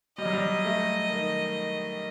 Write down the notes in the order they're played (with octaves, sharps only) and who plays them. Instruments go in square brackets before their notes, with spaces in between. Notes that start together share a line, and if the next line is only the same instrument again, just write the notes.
[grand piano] G3 [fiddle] D#5
[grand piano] F#3
G3
A3
D#3